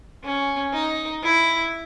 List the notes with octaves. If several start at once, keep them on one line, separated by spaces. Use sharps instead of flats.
C#4
D#4
E4